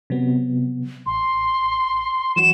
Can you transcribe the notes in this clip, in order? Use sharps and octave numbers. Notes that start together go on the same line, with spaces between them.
C3 F#3 B3
A1 C6
E3 F#3 F#4 E7